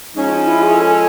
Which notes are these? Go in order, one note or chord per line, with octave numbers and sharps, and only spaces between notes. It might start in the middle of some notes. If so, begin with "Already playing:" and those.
F3 G#3 C#4 D#4
E4
G#4
A4